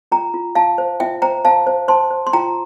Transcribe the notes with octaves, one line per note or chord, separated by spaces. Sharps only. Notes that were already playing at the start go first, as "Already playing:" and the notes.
F4 G5 A#5
F4
F4 F5 A5
C5
F4 E5 G5
C5 G5 A#5
C5 F5 A5
C5
C5 A5 C6
C5
C6
F4 G5 A#5